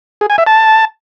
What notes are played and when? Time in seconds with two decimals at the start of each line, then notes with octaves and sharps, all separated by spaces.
0.21 G#4
0.30 G#5
0.38 E5
0.47 A5